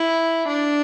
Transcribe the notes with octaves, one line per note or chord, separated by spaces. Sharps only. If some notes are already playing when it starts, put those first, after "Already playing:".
Already playing: E4
D4